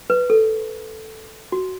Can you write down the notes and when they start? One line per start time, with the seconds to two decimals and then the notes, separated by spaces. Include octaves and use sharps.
0.10 B4
0.30 A4
1.52 F#4